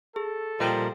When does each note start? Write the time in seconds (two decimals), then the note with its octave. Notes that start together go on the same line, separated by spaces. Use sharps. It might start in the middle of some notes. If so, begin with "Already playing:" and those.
0.16 G#4 A4
0.60 A#2 F3 G3 A#4 D#5 G5